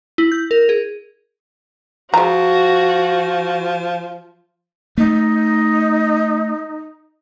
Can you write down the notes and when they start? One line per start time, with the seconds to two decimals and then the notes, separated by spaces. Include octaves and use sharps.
0.18 E4
0.32 G6
0.51 A#4
0.69 G#4
2.14 F3 G#3 F#4 A#5
4.98 A3 D#4